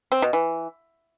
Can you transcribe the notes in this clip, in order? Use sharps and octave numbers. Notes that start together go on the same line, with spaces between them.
C4
B2
E3